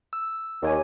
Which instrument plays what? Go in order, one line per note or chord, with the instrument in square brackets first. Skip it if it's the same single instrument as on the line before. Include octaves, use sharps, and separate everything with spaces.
[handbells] E6
[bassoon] D#2 [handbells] G4 C#5 G#5